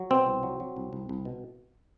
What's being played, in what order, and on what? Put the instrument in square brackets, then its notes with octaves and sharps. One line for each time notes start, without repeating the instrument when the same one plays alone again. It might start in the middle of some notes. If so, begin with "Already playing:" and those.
Already playing: [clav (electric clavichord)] F#3
B2 C4
C2
F#3
F#3
C2
C2
C2
B2